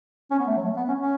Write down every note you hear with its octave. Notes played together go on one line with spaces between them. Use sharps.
C#4
B3
A3
F#3
A3
B3
C#4
C#4